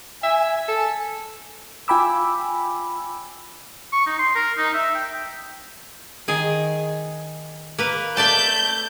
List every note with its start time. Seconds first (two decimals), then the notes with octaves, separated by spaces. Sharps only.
0.23 E5 G#5
0.68 A4
1.88 F4 G5 G#5 B5 D6 E6
3.92 C#6
4.06 D#4
4.19 C6
4.35 A#4
4.58 D#4
4.74 E5
4.95 G5
6.28 D#3 G#4
7.78 A#3 B4
8.17 A3 D5 A5 G6